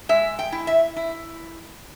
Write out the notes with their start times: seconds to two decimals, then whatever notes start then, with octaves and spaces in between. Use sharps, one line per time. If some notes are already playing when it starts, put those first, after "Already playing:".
0.09 G#3 E5
0.39 G5
0.52 E4
0.67 E5
0.96 E4